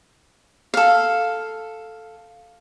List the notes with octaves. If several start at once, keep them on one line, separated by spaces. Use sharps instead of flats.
A4 F5